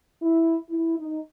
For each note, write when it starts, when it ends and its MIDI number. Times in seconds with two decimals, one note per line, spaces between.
0.21 0.56 64
0.69 0.96 64
0.98 1.20 63